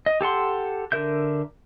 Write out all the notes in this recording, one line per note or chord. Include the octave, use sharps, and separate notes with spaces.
D#5
G4 A4 F#5 C6
D3 A#4 E5 G6